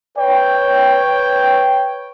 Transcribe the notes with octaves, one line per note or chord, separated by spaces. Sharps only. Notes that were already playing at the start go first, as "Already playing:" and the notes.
B4 C#5 G5